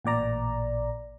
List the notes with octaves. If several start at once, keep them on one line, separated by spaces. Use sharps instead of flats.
A1 A#2 D5 A#5